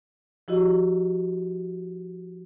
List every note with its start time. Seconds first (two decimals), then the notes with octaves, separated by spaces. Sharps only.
0.48 F3 E4 F#4 G4 D#5